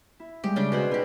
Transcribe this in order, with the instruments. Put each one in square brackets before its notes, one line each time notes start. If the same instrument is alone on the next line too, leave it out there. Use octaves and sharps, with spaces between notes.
[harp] E4
[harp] G3 G#3 [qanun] G4
[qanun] C#3 D4 G5 [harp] C#4
[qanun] B2 C5 F#5 [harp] F#4 G#4
[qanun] B3 G4 [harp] D#4